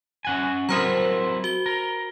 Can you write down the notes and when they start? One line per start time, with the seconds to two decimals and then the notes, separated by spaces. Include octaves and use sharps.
0.25 C#4 F#5 G#5
0.69 F#3 C4 E4 A#4 C5 A#5
1.44 F#4 G7
1.66 A#4